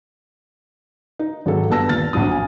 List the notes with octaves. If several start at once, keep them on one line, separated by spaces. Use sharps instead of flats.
D#4
G#1 F#3 G#3 A4
G2 B3 A5 E6 A#6
D#1 A#2 F6 A6
B1 F2 F#3 D4 D#6
G#5